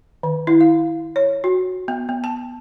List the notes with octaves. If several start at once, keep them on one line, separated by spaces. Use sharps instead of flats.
D#3
E4
F5
C#5
F#4
B3
B3
A5